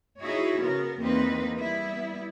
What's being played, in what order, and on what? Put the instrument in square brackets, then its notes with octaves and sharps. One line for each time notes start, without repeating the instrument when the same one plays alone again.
[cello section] D#4 E4 F#4 G#4 C#5
C#3 B3 A#4
E2 A#3 C4 D#4 B4
G3 B3 E4